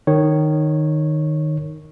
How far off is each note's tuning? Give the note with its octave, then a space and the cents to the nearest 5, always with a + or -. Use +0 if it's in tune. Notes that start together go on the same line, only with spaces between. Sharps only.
D#3 -15 C#5 -10